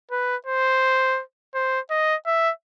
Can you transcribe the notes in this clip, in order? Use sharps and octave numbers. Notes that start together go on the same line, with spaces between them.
B4
C5
C5
D#5
E5